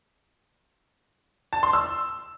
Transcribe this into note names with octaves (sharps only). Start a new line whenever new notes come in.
A5
C6
E6